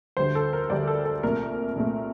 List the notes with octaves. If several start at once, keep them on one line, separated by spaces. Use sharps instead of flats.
D2 D3 G3 C5
A4
A#4
D2 D3 G3 D5
A4
A4
C2 A#2 A3 A#4
C2 A#2 A3